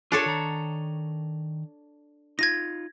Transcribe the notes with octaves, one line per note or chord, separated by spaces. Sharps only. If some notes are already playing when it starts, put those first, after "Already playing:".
D4 F4 G4 A4 A#4 C#5
D#3 A#5
D#4 F4 G#6 A#6